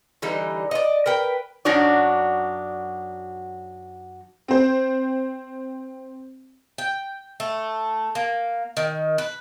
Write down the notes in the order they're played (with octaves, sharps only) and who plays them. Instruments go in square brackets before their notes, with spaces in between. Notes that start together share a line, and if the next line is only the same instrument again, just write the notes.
[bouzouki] D3 E3 G3 D#4
D5 D#5
A#4 B4 G5
[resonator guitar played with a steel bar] F#2 F#3 D4 D#4 F#4 D5
[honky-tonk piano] C4 C5
[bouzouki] G5
A3
A#3
D#3
B4